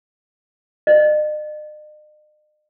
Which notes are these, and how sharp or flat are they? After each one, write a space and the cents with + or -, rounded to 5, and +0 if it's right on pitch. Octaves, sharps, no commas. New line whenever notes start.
D#5 -45